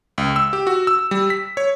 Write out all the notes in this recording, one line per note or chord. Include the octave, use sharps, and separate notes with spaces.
C#2
E6
G4
F#4
E6
G3
B6
C#5